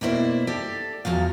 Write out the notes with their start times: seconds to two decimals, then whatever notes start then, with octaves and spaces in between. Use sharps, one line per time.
0.01 B2 A#3 D4 E4 C5
0.47 G4 A4 D5
1.05 E2 F3 F#3 F5